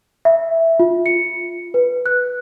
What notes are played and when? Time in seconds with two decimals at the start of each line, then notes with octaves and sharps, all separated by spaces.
0.25 E5
0.80 F4
1.06 C#7
1.74 B4
2.06 F#6